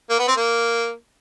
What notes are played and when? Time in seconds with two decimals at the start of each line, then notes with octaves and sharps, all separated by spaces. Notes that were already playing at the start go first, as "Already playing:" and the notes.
0.10 A#3
0.19 B3
0.27 C4
0.36 A#3